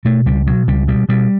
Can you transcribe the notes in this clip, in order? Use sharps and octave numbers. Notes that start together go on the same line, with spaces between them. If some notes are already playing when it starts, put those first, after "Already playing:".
B2 A3
C#2 G3
B2 F#3
C#2 G3
B2 G3
B2 G3